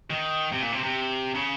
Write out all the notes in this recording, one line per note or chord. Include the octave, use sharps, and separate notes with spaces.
D#3
C3
A#2
C3
C3
C#3